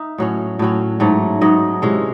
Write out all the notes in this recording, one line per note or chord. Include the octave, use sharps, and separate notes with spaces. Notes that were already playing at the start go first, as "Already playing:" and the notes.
Already playing: D#4 E5
A2 F#3 C#4
A2 F#3 C#4
G#2 F#3 A3
G#2 F#3 A3 D#5
C3 E3 G#3 C#4